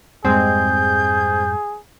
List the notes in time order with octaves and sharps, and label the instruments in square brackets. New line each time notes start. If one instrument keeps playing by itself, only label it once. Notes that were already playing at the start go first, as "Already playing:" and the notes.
[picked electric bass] F2 G#2 G3 [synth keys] G#3 C4 [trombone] G#4 [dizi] G6